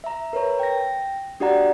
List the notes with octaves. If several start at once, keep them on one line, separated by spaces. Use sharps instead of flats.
E5 A#5
A#4 B4 C#5 A#5
G5 A#6
D4 F#4 G4 D5 F#5 A#5